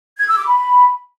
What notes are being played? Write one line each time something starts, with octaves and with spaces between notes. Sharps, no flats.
G#6
E6
D6
B5